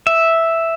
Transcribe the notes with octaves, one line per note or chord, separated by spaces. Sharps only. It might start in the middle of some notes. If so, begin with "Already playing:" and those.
E5